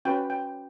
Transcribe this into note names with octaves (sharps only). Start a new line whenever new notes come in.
C#4 F#4 B4 G5
G5